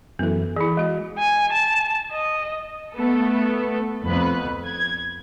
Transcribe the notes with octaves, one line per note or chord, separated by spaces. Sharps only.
F#2 E3 B3 A4
E3 E4 G#4 B5
G#3 F#4 D#5
G#5
A5
D#5
A3 B3 A4
F2 B3 B4 F#6
G#6